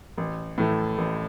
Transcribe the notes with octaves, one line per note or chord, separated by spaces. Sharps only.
A1
A2 E3 A3
A1